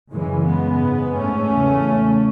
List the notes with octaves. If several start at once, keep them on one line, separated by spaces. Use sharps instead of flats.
F#2 C#3 E3 G#3
G#3 B3
G#2
A3 C#4
E2 C#3